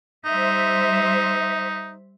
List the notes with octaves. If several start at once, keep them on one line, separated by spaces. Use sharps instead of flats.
G3 D#4 C5 E5